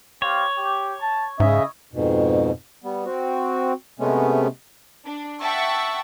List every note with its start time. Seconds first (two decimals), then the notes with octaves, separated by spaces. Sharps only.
0.22 C4 G4 C#5 F5
0.58 G4
1.01 A5
1.40 G#2 C#3 C#4 E4 D#5 E5
1.93 F2 G#2 B2
2.84 G3 B3
3.05 C4 F#4
4.00 C3 G#3 A3 B3 C#4
5.06 D4
5.40 E5 F#5 G5 A5 C#6 E6